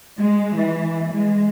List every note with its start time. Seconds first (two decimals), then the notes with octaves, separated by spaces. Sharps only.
0.18 G#3
0.58 E3
1.13 G#3